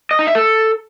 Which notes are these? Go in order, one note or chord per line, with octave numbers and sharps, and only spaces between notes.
D#5
D#4
E5
A4